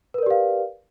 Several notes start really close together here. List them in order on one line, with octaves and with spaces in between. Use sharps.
B4 A#4 D5 G4 F5